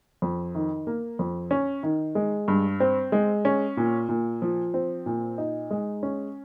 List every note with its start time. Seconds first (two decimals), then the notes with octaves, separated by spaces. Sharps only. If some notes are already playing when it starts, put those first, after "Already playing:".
0.22 F2
0.55 D#3
0.87 A#3
1.19 F2
1.51 C#4
1.83 D#3
2.15 G#3
2.48 G2
2.80 C4
3.12 G#3
3.45 C#4
3.77 A#2
4.09 A#2
4.42 F3
4.74 C4
5.06 A#2
5.38 D#4
5.71 G#3
6.03 C#4